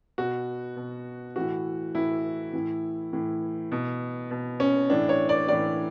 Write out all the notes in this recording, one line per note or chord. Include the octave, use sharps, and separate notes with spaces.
B2 F#4
B2
A2 E3 F#4
A2 E3 E4
A2 E3
A2 E3
B2
B2
C#4
A2 E3 D4
C#5
D5
A2 E3 D5